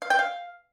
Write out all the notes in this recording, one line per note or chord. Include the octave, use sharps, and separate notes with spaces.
F5
G5
F5